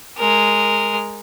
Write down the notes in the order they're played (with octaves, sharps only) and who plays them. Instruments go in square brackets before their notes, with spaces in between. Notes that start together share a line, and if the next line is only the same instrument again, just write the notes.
[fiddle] G#3 A#4